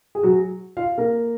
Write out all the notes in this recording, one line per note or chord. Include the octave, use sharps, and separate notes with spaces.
G#4
F#3 F#4
F4 F5
A#3 A#4